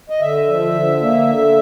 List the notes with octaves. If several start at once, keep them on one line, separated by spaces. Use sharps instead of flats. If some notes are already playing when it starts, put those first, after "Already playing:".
D#5
D3 E5
F3
D3
A#3
D3